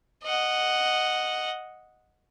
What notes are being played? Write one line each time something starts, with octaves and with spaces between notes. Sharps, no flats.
D#5 F#5